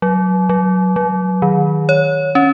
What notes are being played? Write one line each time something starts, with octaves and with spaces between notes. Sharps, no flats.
F#3
F#3
F#3
D#3
C#5
C#4